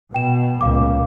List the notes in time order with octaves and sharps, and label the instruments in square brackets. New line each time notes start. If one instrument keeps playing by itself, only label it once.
[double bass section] B2 [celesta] G5 E7
[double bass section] C#2 A#2 [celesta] F5 D6